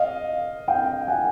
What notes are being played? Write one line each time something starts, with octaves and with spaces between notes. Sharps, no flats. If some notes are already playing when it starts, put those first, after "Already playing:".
Already playing: D#5 F5
F5 G5
F#5 G#5